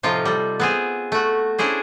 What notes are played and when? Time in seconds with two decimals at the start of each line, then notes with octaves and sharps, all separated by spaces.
0.03 A2 C3 F3 D#4 F4
0.25 G3 A4
0.60 B3 C4 G#4
1.12 A3 F#4
1.58 C#4 D4 E4 G#4 C5